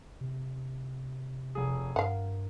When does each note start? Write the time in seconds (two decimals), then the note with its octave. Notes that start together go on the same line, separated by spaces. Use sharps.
0.21 C3
1.55 F1 G#4
1.96 G2 A#4 F5 F#5